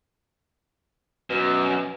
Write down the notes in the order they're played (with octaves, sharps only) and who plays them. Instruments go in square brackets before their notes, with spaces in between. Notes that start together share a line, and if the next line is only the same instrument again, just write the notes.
[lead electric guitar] F#2 [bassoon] B2